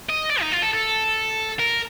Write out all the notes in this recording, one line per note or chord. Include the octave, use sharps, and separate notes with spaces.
D#5
D5
D#4
F4
A4
A4
A#4